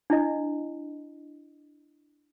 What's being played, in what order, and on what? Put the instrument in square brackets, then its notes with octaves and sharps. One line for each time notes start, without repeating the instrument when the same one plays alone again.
[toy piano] D4 E4 D#5